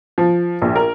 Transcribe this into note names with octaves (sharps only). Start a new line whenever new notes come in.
F3
A#1
A#4